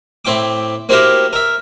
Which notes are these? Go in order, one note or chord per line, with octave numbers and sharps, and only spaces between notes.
A2 C4 E4 G5 D6
A#3 C4 E4 F#4 G4 A#4
A#4 E5